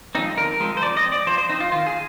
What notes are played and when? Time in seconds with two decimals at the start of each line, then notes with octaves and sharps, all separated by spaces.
0.15 F3 G#3 C4 D#4
0.37 D3 A#4
0.60 F3 G#3 C4
0.77 C5
0.82 F3 D5
0.97 D#5
1.04 C4
1.12 D5
1.26 F3 C5
1.38 C5
1.49 C4 D#4
1.60 F4
1.71 D#3 F4
1.87 G#4